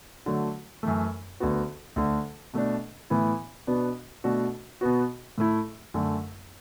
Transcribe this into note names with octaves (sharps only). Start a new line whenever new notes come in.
D3 F#3 A3 F#4
F#2 E3 A3
D2 D3 B3 F#4
D2 D3 A3
B2 A3 D4
A2 E3 B3 E4
B2 B3 D4 F#4
B2 A3 D4 F#4
B2 B3 F#4
A2 A3 E4
F#2 D3 A3